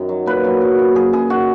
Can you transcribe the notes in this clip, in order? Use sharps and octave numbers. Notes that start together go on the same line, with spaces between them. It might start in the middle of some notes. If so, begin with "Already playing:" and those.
Already playing: F#2 D#3
F#3
A#2 B4
F#3
F#3
A#2
F#2 G#4
F#2 G#4
D#3 F#4